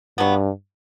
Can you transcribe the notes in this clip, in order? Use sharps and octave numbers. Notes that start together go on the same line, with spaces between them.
G2 F#3 B3